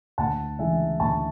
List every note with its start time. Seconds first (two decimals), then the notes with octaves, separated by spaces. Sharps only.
0.18 D2 F#5 A5
0.59 C#3 E3 G#3 E5 G#5
1.00 D2 A5 C#6